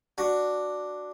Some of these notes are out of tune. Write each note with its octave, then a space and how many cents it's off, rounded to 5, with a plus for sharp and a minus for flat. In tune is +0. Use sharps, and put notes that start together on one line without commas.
D4 +0 F#4 +0